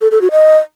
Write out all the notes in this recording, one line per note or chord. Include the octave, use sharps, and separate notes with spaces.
A4
A4
F#4
D#5